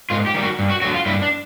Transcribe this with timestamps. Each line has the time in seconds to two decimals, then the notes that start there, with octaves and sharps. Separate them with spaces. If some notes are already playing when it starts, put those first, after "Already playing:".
0.10 G#2 F4
0.26 G4
0.34 D#3 G3
0.43 F#4
0.59 G2
0.70 F#4
0.82 D3 F#3 F#4
0.94 F4
1.06 G2 E4
1.22 D4